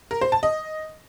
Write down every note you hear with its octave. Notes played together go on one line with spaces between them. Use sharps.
A#4
C5
A5
D#5